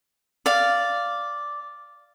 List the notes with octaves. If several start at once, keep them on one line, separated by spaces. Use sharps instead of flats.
D5 F5